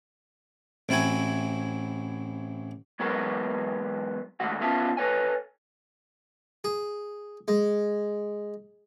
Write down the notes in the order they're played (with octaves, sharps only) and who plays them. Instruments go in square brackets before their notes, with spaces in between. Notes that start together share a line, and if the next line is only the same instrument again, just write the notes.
[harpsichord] A1 C4 E4 F#4 G#5
[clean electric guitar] E2 F#3 G#3 B3 A#4
D#2 G#2 A3 F#4 F#5
B3 C#4 F4 E5 F5 A5
A4 B4 C#5 G#5
[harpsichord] G#4
G#3